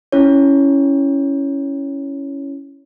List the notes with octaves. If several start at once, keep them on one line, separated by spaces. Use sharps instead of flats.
C#4 E4 C#5